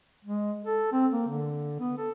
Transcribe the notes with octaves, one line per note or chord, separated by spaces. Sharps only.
G#3
A4
C4
A#3
D3
B3
A4